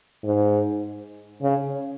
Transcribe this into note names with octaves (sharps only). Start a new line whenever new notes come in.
G#2
C#3